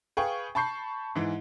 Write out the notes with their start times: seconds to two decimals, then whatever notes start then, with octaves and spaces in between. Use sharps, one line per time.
0.17 G#4 B4 F5 G5 C#6
0.55 A5 B5 C#6 G6 C7
1.15 G#2 E3